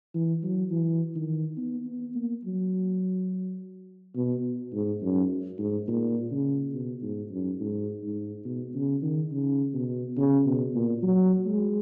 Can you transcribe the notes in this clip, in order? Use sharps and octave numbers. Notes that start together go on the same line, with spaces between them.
E3
F#3
E3
D#3
B3
B3
A#3
F#3
B2
G#2
F#2
G#2
A#2
C#3
B2
G#2
F#2
G#2
G#2
B2
C#3
D#3
C#3
B2
C#3
B2
A#2
F#3
G#3